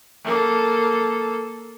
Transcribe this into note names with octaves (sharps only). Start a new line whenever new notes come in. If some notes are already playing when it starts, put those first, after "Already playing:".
A#3 A4